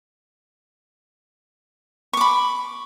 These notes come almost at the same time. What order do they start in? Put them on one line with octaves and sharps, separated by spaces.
C#6 D6 B5